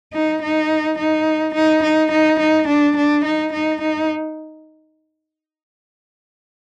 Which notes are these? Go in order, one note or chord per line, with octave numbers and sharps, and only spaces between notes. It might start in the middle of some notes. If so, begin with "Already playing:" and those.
D#4
D#4
D#4
D#4
D#4
D#4
D#4
D4
D4
D#4
D#4
D#4